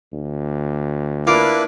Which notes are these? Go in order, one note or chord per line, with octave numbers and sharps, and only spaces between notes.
D2
A#3 D4 E4 F4 B4 D7